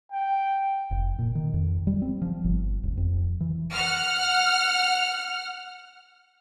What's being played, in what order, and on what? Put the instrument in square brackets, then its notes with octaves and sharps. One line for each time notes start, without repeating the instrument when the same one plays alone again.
[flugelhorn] G5
[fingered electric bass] F1
A#2
D#3
F2
G3
C4
F3
G1
D#1
F2
E3
[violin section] F#5 F6